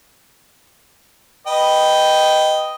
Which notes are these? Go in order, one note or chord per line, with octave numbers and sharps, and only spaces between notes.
B4 D#5 G5